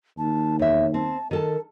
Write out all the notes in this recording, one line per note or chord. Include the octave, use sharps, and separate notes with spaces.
D#2 A5
E2 C#5 E5
C4 A5
D#3 A4 A#4 A5